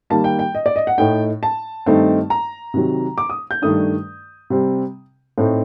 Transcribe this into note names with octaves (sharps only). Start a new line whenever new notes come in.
D#3 G3 A#3 A5
G5
G5
D#5
D5
D#5
F#5
A2 A3 D#4 G5
A5
G2 D#3 A3 C4 D#4
A#5
C3 D#3 F#3
D6
D#6
G6
G2 D#3 A3 D4 D#6
C3 G3 C4
A2 A3 C4 D#4